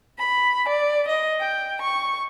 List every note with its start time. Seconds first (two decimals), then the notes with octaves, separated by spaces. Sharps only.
0.16 B5
0.67 D5
1.07 D#5
1.40 G5
1.81 C#6